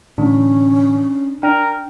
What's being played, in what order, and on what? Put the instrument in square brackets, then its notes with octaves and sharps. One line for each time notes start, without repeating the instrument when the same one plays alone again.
[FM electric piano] A2 D3 E3 [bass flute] C#4 [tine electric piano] D4
[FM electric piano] D4 [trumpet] A#4 [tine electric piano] G5